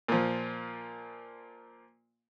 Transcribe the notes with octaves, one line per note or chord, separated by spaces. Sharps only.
A#2 F3